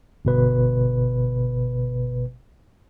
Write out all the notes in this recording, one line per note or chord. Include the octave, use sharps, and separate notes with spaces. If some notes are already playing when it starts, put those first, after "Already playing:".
G1 B2 B4